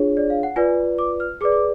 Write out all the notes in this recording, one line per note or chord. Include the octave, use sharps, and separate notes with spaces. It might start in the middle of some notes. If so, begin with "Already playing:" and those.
Already playing: D4 F4 G#4 C#5
D5
F5
F#5
F4 B4 D5 G#5
D6
F6
G#4 B4 D5 D6
D6